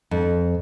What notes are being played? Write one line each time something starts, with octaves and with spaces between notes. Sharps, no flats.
F2